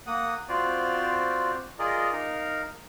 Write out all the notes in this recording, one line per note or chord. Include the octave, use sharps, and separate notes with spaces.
A#3 F#5 D#6
C4 F4 F#4 C5 D5
F4 G#4 A#4 D5 D#5
D#4 A#4 F5